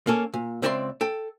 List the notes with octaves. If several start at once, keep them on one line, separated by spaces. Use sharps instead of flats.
A#3 C#4 A4
A#2
C#2 C4 D5 E5 A#5 C6
A4 G5